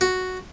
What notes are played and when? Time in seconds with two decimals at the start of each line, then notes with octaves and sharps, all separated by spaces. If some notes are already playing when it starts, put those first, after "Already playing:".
0.01 F#4